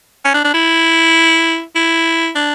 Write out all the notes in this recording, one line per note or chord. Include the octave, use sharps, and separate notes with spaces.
C#4
D4
D4
E4
E4
D4